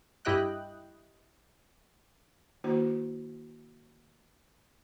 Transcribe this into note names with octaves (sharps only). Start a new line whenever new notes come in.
G2 E4 G4 D#5 G5 F#6
D#3 A#3 D4 E4 F#4 C5